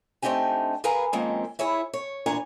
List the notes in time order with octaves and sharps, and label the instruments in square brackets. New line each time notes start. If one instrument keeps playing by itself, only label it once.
[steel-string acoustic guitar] A3 C4 D4 D#4 G4 G#5
G#4 A#4 B4 F5 G#5 A#5
F2 D#3 G#3 A#3 C4 C#4
E4 G#4 C#5 E5
C#5
E2 A#2 D4 C#5 G#5 A#5